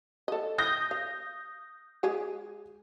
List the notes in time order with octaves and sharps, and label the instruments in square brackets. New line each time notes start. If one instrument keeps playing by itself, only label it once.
[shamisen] A4 D#5
[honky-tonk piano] D#6 G6 A#6
[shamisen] F5
G#3 G4 G#4